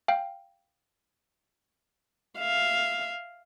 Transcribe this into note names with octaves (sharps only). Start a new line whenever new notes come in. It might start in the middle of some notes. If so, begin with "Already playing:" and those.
F5 G5
E5 F5